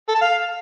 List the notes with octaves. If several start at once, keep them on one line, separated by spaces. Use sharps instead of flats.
A4
A5
F5